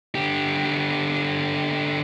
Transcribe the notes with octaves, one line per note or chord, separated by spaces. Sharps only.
D3 G4